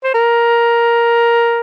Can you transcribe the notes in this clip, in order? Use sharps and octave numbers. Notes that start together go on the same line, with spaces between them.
C5
A#4